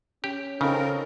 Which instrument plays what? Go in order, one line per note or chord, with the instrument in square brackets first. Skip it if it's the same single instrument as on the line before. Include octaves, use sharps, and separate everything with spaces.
[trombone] C#4 [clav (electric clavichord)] G4
[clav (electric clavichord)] C#3 [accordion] C4 A#4 [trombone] C#4 [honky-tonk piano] D#4 F4 A4